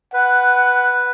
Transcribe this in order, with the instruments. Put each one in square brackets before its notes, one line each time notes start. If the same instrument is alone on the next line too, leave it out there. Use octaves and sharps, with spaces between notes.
[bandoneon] B4 [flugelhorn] F#5